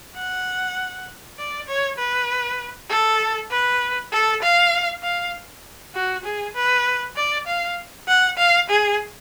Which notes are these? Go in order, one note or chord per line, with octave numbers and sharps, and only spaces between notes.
F#5
D5
C#5
B4
A4
B4
A4
F5
F5
F#4
G#4
B4
D5
F5
F#5
F5
G#4